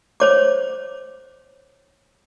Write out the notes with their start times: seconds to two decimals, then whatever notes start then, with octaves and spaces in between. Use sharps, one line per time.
0.20 C5 C#5 D6